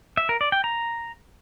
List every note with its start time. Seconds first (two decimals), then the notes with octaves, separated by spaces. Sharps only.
0.17 E5
0.29 A#4
0.41 D5
0.52 G5
0.64 A#5